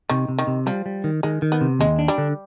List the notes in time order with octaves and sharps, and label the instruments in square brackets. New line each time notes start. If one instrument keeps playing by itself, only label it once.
[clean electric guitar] C3 [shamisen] D#3
[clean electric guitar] C3
[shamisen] D#3
[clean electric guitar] C3
[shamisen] F3 [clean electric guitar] G3
[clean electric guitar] G3
D#3
[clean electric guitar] D#3 [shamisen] G#3
[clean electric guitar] D#3
[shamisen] B3
[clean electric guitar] C3
[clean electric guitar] D#2 [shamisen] G#3
[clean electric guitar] D4
[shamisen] G3
[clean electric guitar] D3